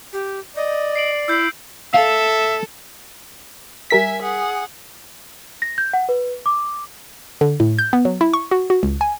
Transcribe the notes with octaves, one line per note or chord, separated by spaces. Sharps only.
G4
D5 D#5
C7 D7 F#7
E4 E6 G6 C7
A4 E5 F5
G3 A#4 E5 G#5 B6
G#4 F#5
A#6
G6
F#5
B4
D6
D3
A2
G6
B3
F#3
E4
C#6
F#4
F#4
C#2
G#5